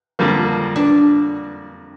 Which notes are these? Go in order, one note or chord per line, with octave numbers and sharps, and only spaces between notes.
F2 D3 G3 A#3
D4